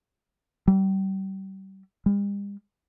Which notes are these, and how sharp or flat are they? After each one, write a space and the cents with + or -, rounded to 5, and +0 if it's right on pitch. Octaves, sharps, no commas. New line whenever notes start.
G3 -30
G3 +45